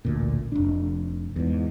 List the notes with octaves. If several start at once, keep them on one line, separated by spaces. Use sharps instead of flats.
A1 D2 A#2
F1 D4
E2 G#2